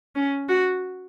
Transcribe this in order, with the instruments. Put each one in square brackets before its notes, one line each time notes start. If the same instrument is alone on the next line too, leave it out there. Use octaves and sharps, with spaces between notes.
[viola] C#4
F#4